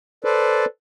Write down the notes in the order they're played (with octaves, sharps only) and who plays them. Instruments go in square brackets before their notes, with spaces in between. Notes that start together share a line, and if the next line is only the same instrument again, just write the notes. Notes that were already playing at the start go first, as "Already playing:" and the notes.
[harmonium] A4 B4 C5 D5